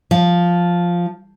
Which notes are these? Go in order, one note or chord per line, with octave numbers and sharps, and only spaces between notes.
F3